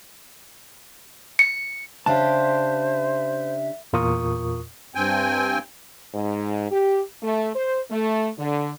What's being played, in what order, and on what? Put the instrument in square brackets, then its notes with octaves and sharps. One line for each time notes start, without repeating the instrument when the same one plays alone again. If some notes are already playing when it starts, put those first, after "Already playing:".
[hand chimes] C#7
[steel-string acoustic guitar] C#3 D4 G4 [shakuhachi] C5 [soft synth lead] E5 [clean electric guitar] F5 A5
[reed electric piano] E2 A#2 F4 A#4 C#6 D#6
[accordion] G2 C4 G5 G#5
[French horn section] G#2
G4
A3
C5
A3
D3